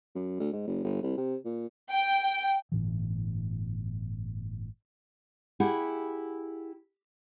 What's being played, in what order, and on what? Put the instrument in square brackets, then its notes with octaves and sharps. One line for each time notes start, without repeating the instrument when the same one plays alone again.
[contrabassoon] F#2
D2
G#2
F#1
G1
C2
C3
A#2
[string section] G5
[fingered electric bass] G1 A2 E3
[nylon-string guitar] E4 G4 G#4 F#5